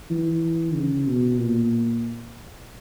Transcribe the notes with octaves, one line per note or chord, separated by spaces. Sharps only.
E3
C#3
B2
A#2